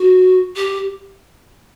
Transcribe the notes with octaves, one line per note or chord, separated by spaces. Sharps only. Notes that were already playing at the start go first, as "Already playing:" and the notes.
Already playing: F#4
G4